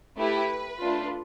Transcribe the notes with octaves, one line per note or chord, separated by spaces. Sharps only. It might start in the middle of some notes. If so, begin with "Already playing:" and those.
A3 E4 G4 B4
A3 D4 F4